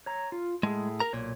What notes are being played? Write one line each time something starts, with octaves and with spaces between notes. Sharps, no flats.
C#5 A#5
F4
A2 G#3 G#4
A#4 A#5
B1 A#2 C#5